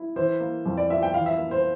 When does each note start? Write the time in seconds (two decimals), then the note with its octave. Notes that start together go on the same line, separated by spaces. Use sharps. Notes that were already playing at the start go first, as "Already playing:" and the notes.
Already playing: E4
0.16 E3 C5
0.40 A#3
0.66 F2
0.77 D5
0.90 F4 E5
1.03 G5
1.14 E3 F5
1.26 E5
1.38 A#3
1.51 C5